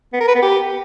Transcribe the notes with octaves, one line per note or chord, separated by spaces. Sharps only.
B3
A#4
B4
B3
G4